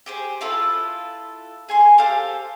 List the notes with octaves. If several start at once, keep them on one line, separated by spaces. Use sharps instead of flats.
G4 G#4 C5
E4 F4 A4 B4
G#4 G#5 C6
G4 A4 C5 F5